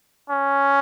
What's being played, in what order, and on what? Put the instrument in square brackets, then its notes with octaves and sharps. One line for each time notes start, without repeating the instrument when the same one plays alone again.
[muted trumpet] C#4